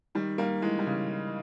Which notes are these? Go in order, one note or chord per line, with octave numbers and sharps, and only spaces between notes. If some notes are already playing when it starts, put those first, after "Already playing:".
D#3 G3
G3 A#3
E3 G#3
G3
C#3 E3